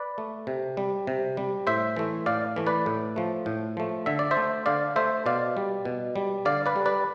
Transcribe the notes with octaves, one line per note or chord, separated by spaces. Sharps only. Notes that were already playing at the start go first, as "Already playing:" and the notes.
Already playing: B4 D5
A3
C3
G3
C3
G3
A2 C5 E5
E3 A3
A2 D5 F5
E3 A3
B4 D5
A2
F3 A3
A2
F3 A3
D3 E5
D5
C5 E5
A3
D3 D5 F5
A3 C5 E5
B2 D5 F5
G3
B2
G3
D3 D5 F5
B4 D5
G3
B4 D5